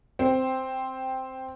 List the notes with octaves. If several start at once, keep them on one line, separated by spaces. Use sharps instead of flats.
C4